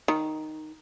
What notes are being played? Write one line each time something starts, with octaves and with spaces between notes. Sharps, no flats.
D#3